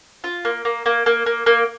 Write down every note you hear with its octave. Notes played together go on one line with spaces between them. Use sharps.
F4
A#3
A#3
A#3
A#3
A#3
A#3